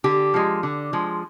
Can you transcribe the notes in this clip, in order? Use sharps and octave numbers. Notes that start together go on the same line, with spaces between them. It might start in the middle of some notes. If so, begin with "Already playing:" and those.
D3 G4
F3 G#3
D3
F3 G#3